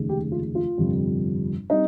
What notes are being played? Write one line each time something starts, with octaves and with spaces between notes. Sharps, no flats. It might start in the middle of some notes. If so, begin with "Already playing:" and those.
Already playing: F1 D#2 C#3 G#3
G4
F4
F4
G1 F2 C3 G3
G3 C4 D#4